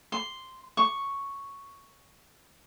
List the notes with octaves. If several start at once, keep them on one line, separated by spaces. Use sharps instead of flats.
C6
C#6